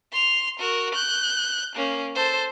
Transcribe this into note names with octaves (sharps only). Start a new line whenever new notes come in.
C6 F7
F#4 A#4
F#6 G6
A#3 C#4
A4 C5